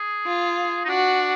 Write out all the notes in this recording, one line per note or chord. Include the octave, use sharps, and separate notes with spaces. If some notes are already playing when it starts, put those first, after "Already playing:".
Already playing: G#4
F4
D#4
D4 F#4